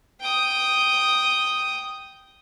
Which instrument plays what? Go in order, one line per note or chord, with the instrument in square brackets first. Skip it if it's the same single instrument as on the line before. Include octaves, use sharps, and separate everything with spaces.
[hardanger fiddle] G5 D#6